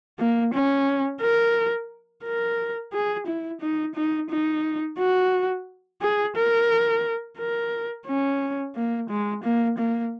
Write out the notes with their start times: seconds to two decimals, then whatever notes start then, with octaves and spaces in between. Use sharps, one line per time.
0.19 A#3
0.54 C#4
1.21 A#4
2.24 A#4
2.93 G#4
3.27 E4
3.61 D#4
3.95 D#4
4.30 D#4
4.98 F#4
6.02 G#4
6.36 A#4
7.39 A#4
8.07 C#4
8.75 A#3
9.09 G#3
9.44 A#3
9.78 A#3